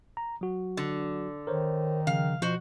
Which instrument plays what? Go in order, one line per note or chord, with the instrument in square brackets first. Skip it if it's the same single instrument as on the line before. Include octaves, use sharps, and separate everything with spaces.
[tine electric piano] A#5
F#3 F#4
[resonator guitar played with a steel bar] D3
[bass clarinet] D#3 [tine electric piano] A#4 C5 C#5
[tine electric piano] C#3 F3 [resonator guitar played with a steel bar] F5
[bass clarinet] B2 [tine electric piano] F3 [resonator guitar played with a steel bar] F#4 C5